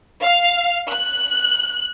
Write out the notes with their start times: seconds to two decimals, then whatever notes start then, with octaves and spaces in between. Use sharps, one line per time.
0.22 F5
0.91 F#6